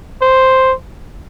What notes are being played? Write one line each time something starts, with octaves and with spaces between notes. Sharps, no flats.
C5